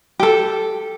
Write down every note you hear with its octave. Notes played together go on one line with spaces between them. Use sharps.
G4 A4